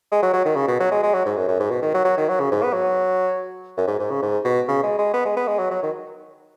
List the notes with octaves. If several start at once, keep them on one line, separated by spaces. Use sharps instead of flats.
G#3
F#3
F#3
D#3
C#3
B2
F#3
G#3
G#3
F#3
G#2
F#2
F#2
G#2
B2
D#3
F#3
F#3
D#3
F#3
C#3
G#2
B3
F#3
F#2
G#2
G#2
C#3
G#2
B2
C#3
G#3
G#3
B3
G#3
B3
G#3
F#3
F#3
D#3